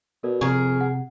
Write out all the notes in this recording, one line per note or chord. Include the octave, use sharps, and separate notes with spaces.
B2 A4 A#4 D5
F2 C3 G#4 A#4 C#6
F#5